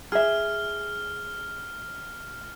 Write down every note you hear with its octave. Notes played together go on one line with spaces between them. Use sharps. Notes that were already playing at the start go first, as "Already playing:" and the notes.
G#4 E5 F6